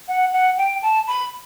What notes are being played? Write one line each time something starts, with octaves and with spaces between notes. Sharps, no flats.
F#5
F#5
G5
A5
B5